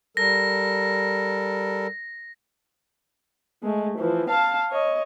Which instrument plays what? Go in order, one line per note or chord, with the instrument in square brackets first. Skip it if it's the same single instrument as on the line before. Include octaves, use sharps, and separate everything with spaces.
[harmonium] G3 A4 A#4 [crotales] A#6
[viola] G#3 A3
E3 F3
F5 A5
C#5 D#5